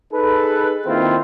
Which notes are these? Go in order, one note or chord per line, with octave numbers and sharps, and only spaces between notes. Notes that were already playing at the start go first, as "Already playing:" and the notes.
D#4 G#4 A4 B4
D#3 A#3 C4 E4 F4 C5